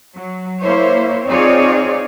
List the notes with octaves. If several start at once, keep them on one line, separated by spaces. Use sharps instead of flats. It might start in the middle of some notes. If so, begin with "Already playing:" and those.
F#3
A#3 E4 C5 C#5
C4 D#4 F4 G#4 C#5 D5